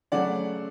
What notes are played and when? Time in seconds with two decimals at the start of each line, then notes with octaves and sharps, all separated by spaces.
0.12 C#3 F#3 A3 D5 F#5